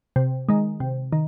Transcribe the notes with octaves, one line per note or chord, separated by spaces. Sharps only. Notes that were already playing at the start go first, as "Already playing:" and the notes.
C3
D#3 G#3
C3
D#3